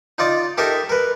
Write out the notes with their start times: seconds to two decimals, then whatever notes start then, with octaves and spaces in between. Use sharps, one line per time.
0.18 D#4 F4 D5 D#5
0.58 D#4 G4 A4 A#4 D#5 E5
0.89 A#4 B4